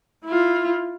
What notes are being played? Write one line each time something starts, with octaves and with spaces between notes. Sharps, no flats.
E4 F4